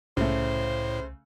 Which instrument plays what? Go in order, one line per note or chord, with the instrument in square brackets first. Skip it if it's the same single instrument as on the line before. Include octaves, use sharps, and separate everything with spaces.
[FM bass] C2 [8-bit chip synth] A2 [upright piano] C#3 A3 [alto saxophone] C5